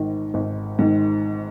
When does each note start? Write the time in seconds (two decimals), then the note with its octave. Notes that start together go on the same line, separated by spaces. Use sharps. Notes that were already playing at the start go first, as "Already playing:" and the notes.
Already playing: G#1 G#2 D#3
0.34 G#1
0.79 G#2 D#3